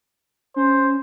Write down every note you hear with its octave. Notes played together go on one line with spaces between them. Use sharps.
C#4 C5